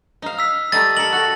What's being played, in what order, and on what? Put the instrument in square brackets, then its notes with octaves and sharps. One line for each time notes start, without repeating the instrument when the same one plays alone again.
[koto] D#4 F5
[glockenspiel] E6 B6
[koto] G3 A3 D#4 [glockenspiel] A6
[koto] A4 A#4 [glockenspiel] F#7
[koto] F#4 A4